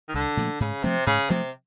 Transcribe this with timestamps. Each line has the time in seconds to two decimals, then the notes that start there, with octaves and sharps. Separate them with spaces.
0.09 D#3
0.14 C2 D3
0.37 A#2 F3 A3
0.60 G#2 C#3
0.83 C3 F3 A3 C4
1.07 G#2 C#3
1.30 C3 F3 A3 C4